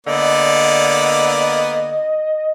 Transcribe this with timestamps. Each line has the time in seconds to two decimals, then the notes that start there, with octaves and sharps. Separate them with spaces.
0.07 D3 A#3 B3 D5 D#5